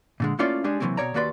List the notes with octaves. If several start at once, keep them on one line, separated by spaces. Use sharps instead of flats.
A#2 D3 G#3
A3 A#3 C#4 E4 F4 D5
G3 G#3 D4 G#4
C3 D#3 E3 F#3 A#3 C4
B2 C#5 D5 A#5
D#2 A#3 F#4 B4 D5 C6